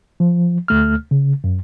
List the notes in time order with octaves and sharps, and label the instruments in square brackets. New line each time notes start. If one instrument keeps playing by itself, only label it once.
[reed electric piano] F3
D2 A3 F6
C#3
F#2